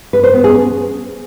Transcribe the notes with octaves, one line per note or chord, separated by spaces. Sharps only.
B4
C5
B3
G#4
C#4